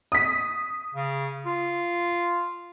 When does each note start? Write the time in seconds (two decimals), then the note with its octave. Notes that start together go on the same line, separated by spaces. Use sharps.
0.12 D#6 B6
0.94 C#3
1.46 F4